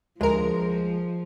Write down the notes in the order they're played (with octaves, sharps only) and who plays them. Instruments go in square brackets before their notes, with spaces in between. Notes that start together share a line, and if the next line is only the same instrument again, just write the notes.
[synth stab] D2 A#4 [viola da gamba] F3 [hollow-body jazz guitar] G#3